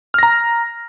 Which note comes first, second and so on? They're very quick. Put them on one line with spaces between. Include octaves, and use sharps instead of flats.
F6 A#6 A#5